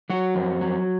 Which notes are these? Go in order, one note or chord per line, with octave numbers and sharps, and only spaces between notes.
F#3 F#4
F2
F#3